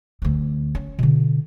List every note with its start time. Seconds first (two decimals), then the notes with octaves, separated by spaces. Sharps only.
0.22 D2 C4
0.75 C#4
0.99 B2 D3